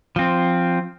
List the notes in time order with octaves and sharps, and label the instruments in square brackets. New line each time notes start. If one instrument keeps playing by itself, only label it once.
[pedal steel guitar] F3 C4